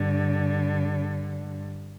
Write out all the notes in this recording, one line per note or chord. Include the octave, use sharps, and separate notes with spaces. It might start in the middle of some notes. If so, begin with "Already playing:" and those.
Already playing: G2 D3